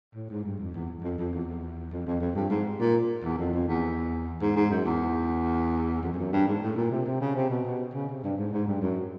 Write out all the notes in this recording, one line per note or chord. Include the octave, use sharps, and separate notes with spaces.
A2
G#2
G2
F2
E2
F2
F2
E2
F2
F2
F2
G2
G#2
A#2
E2
F2
F2
E2
G#2
G#2
F#2
E2
F2
F2
F#2
G2
G#2
A2
A#2
C3
C3
C#3
C3
B2
B2
C#3
C3
G2
G#2
G#2
G2
F#2